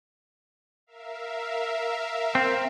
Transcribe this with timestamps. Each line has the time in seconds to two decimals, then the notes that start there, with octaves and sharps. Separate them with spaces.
0.87 A#4 E5 F5
2.35 C4